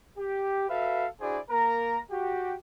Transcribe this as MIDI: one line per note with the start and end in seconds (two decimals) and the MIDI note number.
0.18 0.68 67
0.69 1.06 66
0.69 1.06 69
0.69 1.06 71
0.69 1.06 76
0.69 1.06 77
1.21 1.39 62
1.21 1.39 64
1.21 1.39 66
1.21 1.39 68
1.21 1.39 72
1.21 1.39 74
1.51 2.01 58
1.51 2.01 70
1.51 2.01 82
2.11 2.55 66
2.11 2.55 67